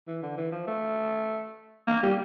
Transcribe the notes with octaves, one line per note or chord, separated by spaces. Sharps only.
E3
D3
E3
F3
A3
A#3
G3